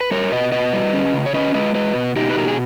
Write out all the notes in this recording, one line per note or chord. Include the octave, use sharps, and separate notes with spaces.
B4
G3 A#4 C#5
B2 B4 D#5
B2 B4 D#5
G3
C#4
C#3
C#5
C#4 B4 D#5
G#3 B4 D#5
G#3 B4 D#5
B2
B2 D#4 G4
B4
B2 A#4
G#4